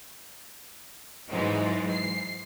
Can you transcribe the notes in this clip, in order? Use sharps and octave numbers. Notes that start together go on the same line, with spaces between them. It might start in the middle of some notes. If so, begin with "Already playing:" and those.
G#2 E3 F#3 G#3
C7